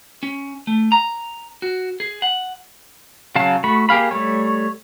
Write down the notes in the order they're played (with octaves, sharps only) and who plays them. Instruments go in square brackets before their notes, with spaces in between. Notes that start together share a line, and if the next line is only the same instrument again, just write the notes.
[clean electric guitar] C#4
A3
A#5
F#4
G#4
F#5
[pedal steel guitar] C#3 F#3 F5 A5
A3 F#4 B5
A#3 G4 G#4 F5 B5
G3 A3 C#5